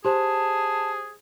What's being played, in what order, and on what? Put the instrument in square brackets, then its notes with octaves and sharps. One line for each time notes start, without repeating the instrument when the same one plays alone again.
[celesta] G4 C5 [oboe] G#4 [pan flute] A5